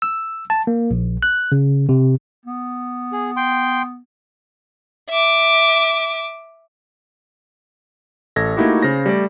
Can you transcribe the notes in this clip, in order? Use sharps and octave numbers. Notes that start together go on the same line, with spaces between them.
E6
A5
A#3
A#1
F#6
C#3
C3
B3
G#4
G5 C6
E5 D6
A1 A4 G#6 A#6
A3 A#3 D#4 E4 F#4 G4
C#3 C5 A#6
G3 A3 D5